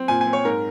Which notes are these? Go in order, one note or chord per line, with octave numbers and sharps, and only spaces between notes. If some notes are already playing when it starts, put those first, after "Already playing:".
Already playing: C4
A#2 G#5
G#5
C4
C#5
G#2 A#4